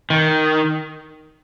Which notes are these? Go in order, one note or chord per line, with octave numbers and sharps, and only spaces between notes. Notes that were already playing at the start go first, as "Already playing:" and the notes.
D#3